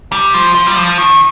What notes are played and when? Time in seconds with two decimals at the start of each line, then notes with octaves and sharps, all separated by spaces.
0.12 G3
0.34 F3
0.55 F3
0.67 G3
0.76 F3
0.98 D#3